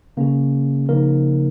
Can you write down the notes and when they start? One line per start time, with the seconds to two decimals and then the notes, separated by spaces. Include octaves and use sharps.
0.17 C#3 A#3 C#4 G#4
0.89 C#3 F3 A#3 D#4 A#4